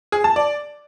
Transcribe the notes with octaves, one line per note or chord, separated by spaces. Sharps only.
G#4
A5
D5